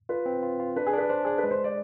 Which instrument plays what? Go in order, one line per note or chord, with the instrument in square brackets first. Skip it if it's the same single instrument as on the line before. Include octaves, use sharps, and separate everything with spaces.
[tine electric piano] F4 [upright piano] B4
[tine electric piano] C4
F4
F4
[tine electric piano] D4 [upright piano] B4
[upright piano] G#4
[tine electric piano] D4 [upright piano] B4
[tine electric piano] D4 [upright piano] C5
[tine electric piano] D4 [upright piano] G#4
[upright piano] B4
[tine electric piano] G#3
[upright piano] C5
D5